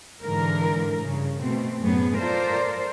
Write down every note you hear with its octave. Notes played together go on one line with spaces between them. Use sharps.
G#2 D3 E3 A#4
G2 C#3
B2 A3 C4
F#2 A2 B3 G#4
F4 A4 A#4 C5 D5